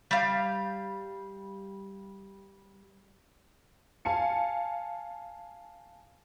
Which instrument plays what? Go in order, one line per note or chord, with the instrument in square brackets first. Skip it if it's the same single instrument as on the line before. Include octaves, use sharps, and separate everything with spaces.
[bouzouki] G3 F5
[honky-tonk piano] F5 G#5 A5 C#7